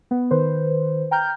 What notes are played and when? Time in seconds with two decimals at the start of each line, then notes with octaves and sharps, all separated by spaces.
0.11 B3
0.31 D#3 B4 C5
1.11 G5 A#5 F6 G6